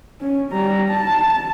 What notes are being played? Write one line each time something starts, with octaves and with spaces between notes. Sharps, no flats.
C#4
G3 A#5
A5